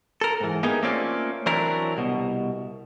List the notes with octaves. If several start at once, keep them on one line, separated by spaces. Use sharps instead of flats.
A4 A#4
G#2 E3
A#3 B3 D#4 G4 G#4 A#4
A3 A#3 C4 C#4 F4 D5
E3 F#3 C4 D4 E4 A#4
C2 B2